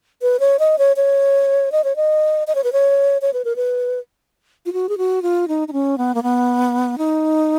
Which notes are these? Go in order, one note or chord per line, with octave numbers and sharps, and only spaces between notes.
B4
C#5
D#5
C#5
C#5
D#5
C#5
D#5
D#5
C#5
B4
C#5
C#5
B4
A#4
B4
F4
F#4
G#4
F#4
F4
D#4
D#4
C#4
B3
A#3
B3
D#4